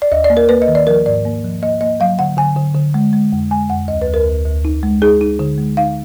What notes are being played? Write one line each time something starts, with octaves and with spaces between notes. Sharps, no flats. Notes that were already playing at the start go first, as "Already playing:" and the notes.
D5
D#2 D#5
D5
A#3
A#4
A#3 B4
D#5
D#3
D5
F3 A#4
G#2 D5
A#3
F3
A#3 D#5
A#3 D#5
F#3 F5
D3 F#5
D3 G#5
D3
D3
G#3
G#3
F2
G#3 G#5
F2 F#5
D2 D#5
B4
D2
A#4
D2
D2
D#4
G#3
D#4 G#4
D#4
D3
G#3
D#4 F5